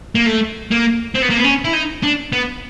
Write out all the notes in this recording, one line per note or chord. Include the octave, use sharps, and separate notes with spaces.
A#3
A3
A#3
C4
B3
A#3
B3
C#4
E4
D#4
D4
B3